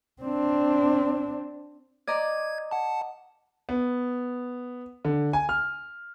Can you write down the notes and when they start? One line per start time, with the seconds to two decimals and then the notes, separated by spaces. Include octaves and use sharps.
0.22 C4 D4
2.08 D5 D#5 A#5 G#6
2.71 F#5 A5
3.69 B3
5.05 D3
5.33 G#5
5.49 F6